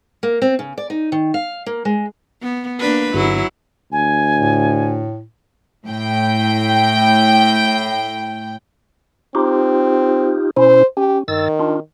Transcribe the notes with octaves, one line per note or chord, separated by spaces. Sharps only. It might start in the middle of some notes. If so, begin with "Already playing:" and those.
A#3
C4
C#3
D5
D#4
D#3
F5
A#3
G#3
B3
A#3 D4 B4
G1 F#3 E4
D2 G#5
A2
A2 G5
C4 D#4 F4 G4
B2 C#4 E4 C5
C#4 G4
G2 D#3 E6 A6
D4 F4